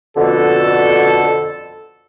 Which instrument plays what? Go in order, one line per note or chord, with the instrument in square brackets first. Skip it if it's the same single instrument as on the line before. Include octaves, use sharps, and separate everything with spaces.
[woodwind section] F2 B2 D3 [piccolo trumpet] A4